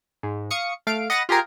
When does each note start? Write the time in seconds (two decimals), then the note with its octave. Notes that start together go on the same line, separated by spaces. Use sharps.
0.23 G#2
0.51 F5 C#6 D#6 C#7
0.87 A3 F5 D7
1.10 D#5 F#5 B5 A6 A#6 C#7
1.29 F4 G4 G#4 A#4